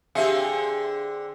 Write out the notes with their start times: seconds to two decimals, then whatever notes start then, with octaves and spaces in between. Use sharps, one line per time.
0.15 D3 C4 G4 G#4 E5 F5